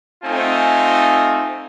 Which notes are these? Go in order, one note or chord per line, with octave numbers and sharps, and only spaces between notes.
A3 C4 D#4 F4 G#5